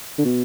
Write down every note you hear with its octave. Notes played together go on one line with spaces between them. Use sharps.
D3
B2